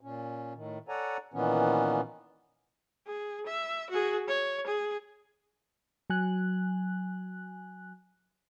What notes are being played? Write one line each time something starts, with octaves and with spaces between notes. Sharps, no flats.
A#2 C#4
A2 D#3
A4 C#5 D5 F#5 G#5 A#5
A#2 D#3 E3 B3 C#4
G#4
E5
F#4 G#4
C#5
G#4
F#3 G#5 F#6